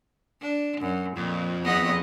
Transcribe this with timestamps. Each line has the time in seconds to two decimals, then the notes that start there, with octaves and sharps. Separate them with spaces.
0.42 D4
0.81 F#2
1.16 F2 A#2
1.63 E2 B3 D#5